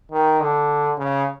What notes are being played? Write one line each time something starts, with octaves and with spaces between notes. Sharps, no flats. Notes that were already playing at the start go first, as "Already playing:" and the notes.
D#3
D3
C#3